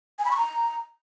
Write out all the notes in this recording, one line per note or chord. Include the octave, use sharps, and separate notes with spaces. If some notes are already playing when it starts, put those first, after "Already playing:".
G#5
B5
C#6
A#5